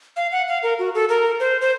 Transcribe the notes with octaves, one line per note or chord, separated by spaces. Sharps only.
F5
F#5
F5
A#4
F#4
A4
A#4
C5
C5